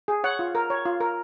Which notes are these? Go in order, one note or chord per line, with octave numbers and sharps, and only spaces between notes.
G#4
C#5 F#5
F4
A#4
C#5
F4
A#4